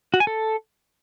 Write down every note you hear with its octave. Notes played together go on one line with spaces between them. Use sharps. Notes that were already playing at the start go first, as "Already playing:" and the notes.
F#4
G#5
A4